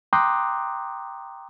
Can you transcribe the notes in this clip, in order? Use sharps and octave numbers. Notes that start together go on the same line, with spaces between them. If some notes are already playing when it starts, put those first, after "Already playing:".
G5 A#5 C6 D6 D#6 F#6